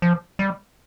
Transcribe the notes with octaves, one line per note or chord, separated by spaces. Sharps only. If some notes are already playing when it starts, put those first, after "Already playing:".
F3
G3